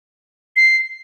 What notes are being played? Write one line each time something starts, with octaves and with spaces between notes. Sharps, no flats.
C7